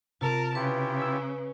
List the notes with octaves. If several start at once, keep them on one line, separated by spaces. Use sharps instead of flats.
C3 F4 A#4 A5
C#3 E4 F4 G4 B4
E6 G#6 B6